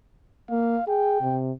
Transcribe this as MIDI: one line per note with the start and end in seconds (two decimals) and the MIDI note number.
0.50 0.76 58
0.50 0.85 77
0.87 1.19 68
0.87 1.38 79
1.21 1.51 48